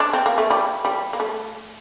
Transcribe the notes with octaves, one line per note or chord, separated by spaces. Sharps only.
D4
C4
A#3
A3
G3
G3
A#3
A3